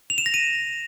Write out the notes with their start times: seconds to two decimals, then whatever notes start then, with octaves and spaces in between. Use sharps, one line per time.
0.10 F7
0.18 E7
0.26 A#6
0.34 D#7